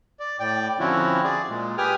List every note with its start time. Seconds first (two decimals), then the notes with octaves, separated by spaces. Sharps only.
0.20 D5
0.40 A2 D5 G5
0.80 D3 F3 C4 C#4 E4 F#4
1.24 G#4 D5
1.49 A#2 G#3
1.78 G4 B4 G5 G#5 D#6 F6